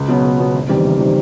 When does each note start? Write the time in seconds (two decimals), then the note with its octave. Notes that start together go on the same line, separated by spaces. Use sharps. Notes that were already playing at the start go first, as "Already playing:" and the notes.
Already playing: C#2
0.08 B2 F#3 B3
0.24 C#2
0.40 B2 F#3 B3
0.55 F#1
0.69 E2 C3 D#3 G3
0.85 F#1
1.00 C3 D#3 G3